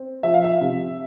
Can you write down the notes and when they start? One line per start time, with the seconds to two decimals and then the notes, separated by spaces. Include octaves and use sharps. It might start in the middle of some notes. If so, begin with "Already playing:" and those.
Already playing: C4
0.23 F3 E5
0.34 F5
0.44 E5
0.61 C3